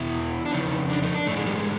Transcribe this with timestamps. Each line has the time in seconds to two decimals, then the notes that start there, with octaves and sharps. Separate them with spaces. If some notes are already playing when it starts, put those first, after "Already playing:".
Already playing: E2 B2 E4
0.46 D4
0.52 F2 C#3 D#4
0.89 D4
1.02 D#4
1.15 D4
1.27 G#2 E3 A3
1.37 G#3
1.46 G3
1.55 G#3